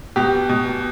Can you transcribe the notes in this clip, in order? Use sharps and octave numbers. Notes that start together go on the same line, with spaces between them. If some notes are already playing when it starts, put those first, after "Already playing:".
B2 G4
B2